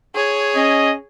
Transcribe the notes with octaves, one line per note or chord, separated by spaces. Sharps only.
G#4 C#5
C#4 D#5